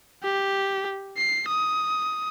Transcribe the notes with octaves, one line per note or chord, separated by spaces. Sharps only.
G4
C7
D#6